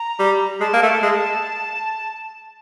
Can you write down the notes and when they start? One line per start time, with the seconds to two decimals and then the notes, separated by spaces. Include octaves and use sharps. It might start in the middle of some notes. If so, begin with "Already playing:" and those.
Already playing: A#5
0.20 G3
0.61 G#3 A5
0.74 A#3
0.83 A3
1.03 G#3